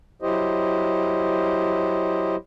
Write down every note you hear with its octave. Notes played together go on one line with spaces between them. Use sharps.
F#3 E4 G4 C5 D#5